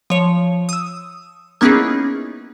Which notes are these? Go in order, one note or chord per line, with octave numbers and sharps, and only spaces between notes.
F3 C#5
D#6 E6
A#3 B3 C#4 D#4 E4 G#4